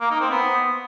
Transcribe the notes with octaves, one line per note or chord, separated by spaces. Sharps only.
A#3
D#4
C4
B3